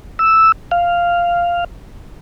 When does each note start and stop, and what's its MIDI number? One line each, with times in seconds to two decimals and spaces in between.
0.19 0.52 88
0.71 1.64 77